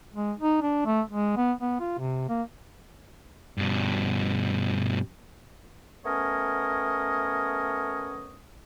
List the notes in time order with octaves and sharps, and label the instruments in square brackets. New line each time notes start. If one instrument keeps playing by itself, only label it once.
[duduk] G#3
D#4
D4
A3
G#3
B3
B3
F4
C3
A#3
[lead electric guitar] G2 B2
[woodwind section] A3 B3 C#4 A#4 C#5 D#5